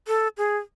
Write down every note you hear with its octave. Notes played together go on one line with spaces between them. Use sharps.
A4
G#4